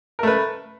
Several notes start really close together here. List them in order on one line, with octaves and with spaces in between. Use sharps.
A#4 A3 B4